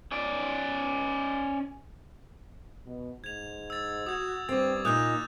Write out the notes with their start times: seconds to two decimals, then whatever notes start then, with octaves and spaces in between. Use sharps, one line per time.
0.12 C#4 D5
2.86 B2
3.24 G#2 G#6 F7
3.70 E6 A6
4.07 F#4 D#6 G#6
4.49 G2 C4 D6 A6
4.85 A#2 D#4 D#6 F#6 G6 F7